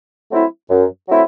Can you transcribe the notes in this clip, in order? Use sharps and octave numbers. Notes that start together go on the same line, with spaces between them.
F#3 A3 C4 E4
F#2
F#3 A3 C4 E4